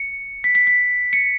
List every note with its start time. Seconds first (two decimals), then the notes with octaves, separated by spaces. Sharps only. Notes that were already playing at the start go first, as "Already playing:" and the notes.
Already playing: C#7
0.44 B6
0.55 B6
0.67 B6
1.13 C#7